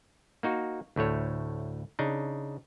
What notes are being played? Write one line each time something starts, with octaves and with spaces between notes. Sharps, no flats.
A#3 D#4 F#4
D2 A2 A3 C#5
C#3 D4 D#4